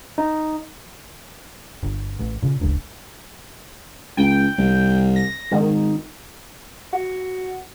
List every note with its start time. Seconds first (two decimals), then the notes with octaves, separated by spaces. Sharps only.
0.18 D#4
1.83 G1
2.19 A1
2.42 A#2 C#3
2.59 D1 G1 C#2
4.17 C#2 G5
4.58 C2
5.16 A#6
5.52 G#1 D#3
6.93 F#4